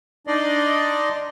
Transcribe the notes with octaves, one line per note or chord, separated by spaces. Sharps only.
D4 D#4 D5 D#5 C6